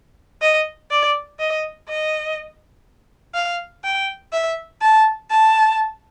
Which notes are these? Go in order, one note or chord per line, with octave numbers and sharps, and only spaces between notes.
D#5
D5
D#5
D#5
F5
G5
E5
A5
A5